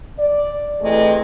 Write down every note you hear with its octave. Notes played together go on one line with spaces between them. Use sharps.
D5
C3 E3 G#3 A3